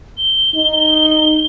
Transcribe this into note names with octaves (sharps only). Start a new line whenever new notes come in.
G7
D#4